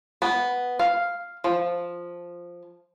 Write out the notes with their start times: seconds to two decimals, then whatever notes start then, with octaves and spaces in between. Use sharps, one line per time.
0.22 B3
0.79 F5
1.44 F3